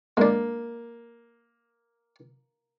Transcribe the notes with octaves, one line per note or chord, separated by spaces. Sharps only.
G#3 A#3 D4